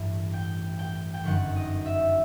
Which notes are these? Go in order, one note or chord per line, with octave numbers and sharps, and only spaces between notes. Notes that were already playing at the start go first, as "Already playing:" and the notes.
Already playing: A1 G2 E3
G5
G5
G5
G1 F#2 D#3 F#3 F#5
D#5
E5